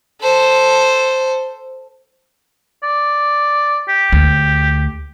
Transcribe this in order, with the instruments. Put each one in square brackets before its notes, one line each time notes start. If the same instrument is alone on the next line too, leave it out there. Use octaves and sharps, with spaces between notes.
[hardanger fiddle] A4 C5
[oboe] D5
G4
[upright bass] D2